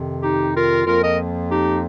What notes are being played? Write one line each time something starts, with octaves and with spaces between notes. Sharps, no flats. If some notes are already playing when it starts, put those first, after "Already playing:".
Already playing: F2 C3 D#3
D#4 G4
F4 A#4
F2 F3 A#3 F4 A#4
A#4 D#5
D#4 G4